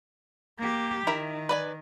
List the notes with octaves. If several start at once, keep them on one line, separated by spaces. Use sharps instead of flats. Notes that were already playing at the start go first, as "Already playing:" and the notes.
A#3 G4
D#3 E4 A#4 E5
B4 D5 G#5